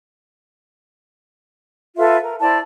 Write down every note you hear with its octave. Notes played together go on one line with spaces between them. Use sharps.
F4 A4 B4 E5
A#4
E4 C5 D5 A5